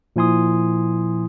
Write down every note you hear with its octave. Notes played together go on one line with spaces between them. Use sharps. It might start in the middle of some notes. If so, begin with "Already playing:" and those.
A#2 F3 E4 G#5 C6 D#6